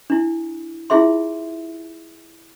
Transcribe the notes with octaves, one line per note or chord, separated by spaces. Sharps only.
D4 E4
E4 F4 G#4 E5 C6